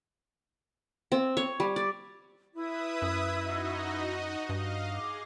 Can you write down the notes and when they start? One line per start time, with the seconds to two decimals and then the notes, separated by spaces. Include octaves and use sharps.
1.12 C4
1.37 C#5
1.60 G3
1.76 D5
2.55 E4 B4 E5 D#6
3.02 F#2
3.35 D#4 F#4 D#5
4.49 G2 D#5 F5
4.94 G#4 D6